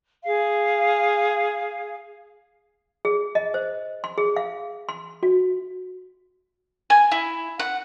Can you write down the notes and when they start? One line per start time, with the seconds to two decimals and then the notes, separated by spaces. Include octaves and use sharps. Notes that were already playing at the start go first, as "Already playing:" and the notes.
0.23 G#4 F5
3.05 G#4
3.35 D#5
3.54 C5
4.04 C6
4.18 G#4
4.36 F5
4.89 C6
5.23 F#4
6.90 G#5
7.11 E4
7.59 F#5